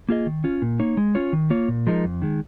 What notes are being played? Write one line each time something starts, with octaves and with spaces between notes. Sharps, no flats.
A#3 F4 G#4 D#5
D#3
C#4 F4
A#2
A#3 D#4 C#5
G#3
C#4 F4 C#5
D#3
A#3 F4 C#5
A#2
F3 G#3 D#4 A#4
F2
D#3 G#3